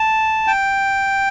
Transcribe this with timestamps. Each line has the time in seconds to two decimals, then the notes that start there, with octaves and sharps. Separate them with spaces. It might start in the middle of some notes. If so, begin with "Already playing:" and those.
Already playing: A5
0.47 G5